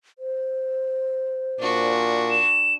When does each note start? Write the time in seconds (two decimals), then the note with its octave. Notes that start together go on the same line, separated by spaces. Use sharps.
0.19 C5
1.60 A#2 D4 F#4
2.30 E7